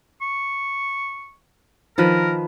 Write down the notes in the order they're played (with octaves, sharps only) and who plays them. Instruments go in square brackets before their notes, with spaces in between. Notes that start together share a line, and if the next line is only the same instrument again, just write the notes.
[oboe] C#6
[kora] D#3 F3 B4 [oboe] A#4